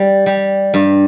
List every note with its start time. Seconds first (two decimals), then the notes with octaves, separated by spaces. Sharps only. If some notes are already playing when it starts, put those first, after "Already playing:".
Already playing: G3
0.26 G3
0.74 G2